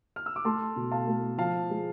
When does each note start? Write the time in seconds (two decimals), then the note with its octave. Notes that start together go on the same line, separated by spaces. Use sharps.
0.16 F6
0.26 E6
0.36 D6
0.45 A3 A5 C6
0.76 B2
0.92 F5 A5
1.07 A3
1.38 F3 F5 A5
1.70 G#3